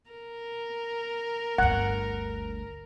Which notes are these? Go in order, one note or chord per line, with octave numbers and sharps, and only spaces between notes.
A#4
G1 D2 F#5